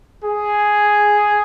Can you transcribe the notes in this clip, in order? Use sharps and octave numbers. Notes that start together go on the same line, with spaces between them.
G#4